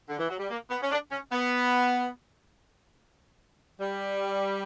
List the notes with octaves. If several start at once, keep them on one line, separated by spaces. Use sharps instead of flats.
D3
E3
F#3
G3
A#3
B3
C#4
D4
C#4
B3
G3